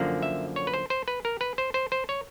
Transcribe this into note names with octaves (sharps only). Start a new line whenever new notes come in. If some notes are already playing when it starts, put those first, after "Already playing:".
Already playing: F#2 D3 F3 A#3
E5
C#5
B4
C5
C5
B4
A#4
B4
C5
C5
C5
C#5